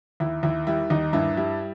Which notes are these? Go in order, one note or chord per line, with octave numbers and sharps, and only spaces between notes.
D#2 E4
D#2 E4
G3 E4
D#2 D#4
G2 E4
G3 E4